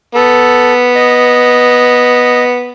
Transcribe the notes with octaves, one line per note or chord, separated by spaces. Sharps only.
B3 A4
D#5